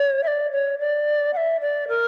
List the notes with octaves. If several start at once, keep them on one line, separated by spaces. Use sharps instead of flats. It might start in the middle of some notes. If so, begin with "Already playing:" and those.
Already playing: C#5
E5
D5
C#5
D5
F#5
E5
D5
A#4